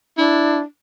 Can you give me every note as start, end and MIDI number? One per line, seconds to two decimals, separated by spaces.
0.17 0.60 62
0.17 0.59 64